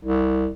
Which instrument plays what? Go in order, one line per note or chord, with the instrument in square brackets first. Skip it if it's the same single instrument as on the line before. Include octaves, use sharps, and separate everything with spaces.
[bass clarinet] C2